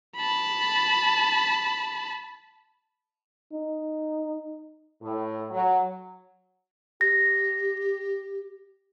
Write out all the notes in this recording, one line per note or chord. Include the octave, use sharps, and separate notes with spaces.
A5 B5
D#4
A2
F#3
G4 A#6